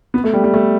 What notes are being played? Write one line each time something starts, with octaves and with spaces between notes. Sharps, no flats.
B3
A3
G3
G3
A3